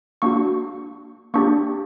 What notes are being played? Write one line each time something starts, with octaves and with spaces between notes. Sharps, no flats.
A#3 D4 F#4 C#6
A#3 D4 G4 C#6